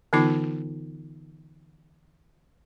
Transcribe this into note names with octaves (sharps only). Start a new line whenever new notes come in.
D3 E3 B3 D#4 F4 D6